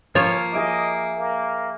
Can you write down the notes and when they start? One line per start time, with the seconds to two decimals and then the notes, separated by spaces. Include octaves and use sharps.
0.15 F3 A#3 F4 C#5
0.53 G#4 D#5 E5 D6
1.17 A#3